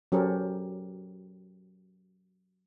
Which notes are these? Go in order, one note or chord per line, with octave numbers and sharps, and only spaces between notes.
F#3 C#4 G4 A4 A#4 C5